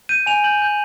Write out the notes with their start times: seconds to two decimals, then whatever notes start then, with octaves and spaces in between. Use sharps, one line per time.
0.09 G6 D#7
0.26 G#5 F7
0.44 G6 F#7
0.62 G6